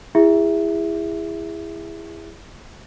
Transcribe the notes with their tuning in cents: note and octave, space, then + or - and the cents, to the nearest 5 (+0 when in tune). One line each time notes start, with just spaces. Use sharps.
E4 +15 G#4 -25 E5 +0